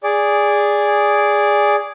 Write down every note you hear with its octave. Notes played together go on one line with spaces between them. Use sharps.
G#4 D5